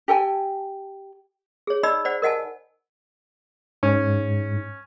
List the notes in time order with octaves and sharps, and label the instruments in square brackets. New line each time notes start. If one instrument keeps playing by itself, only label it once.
[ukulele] G4 A4 G5 G#5
[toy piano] G#4 C#5
D#4 D5 D#5 B5 E6
C5 D5 F#5
A#4 D#5 F#5 G#5 A5
[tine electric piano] G#2 [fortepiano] C#4